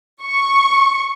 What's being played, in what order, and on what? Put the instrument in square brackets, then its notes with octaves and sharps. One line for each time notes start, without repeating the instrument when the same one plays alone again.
[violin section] C#6